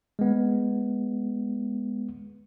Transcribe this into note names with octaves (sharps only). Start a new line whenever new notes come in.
G#3 B3